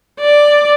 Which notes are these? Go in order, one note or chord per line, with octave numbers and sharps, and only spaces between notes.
D5